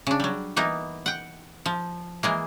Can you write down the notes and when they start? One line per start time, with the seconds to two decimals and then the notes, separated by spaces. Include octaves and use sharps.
0.07 C#3 D4
0.20 F#3 G3
0.56 E3 A#3 B3 D#4
1.06 F#5 G5
1.66 F3
2.23 E3 G#3 A#3